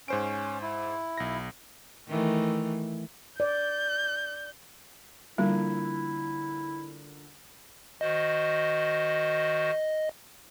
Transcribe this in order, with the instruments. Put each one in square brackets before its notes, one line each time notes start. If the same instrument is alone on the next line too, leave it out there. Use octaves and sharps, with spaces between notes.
[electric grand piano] G#2 C5 D7 [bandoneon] C#4
[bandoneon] E4
[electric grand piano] B1 A#6
[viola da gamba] D#3 E3 A3
[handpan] D5 [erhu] G6
[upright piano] D3 F3 A#3 [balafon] G3 [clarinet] E4
[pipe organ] D#3 F#4 C5 [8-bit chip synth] D#5